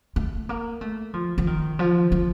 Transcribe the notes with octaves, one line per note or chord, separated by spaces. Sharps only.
A3
A#3
A3
F3
F3
D#3
F3
F3